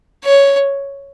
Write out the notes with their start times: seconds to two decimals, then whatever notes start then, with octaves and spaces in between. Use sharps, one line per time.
0.24 C#5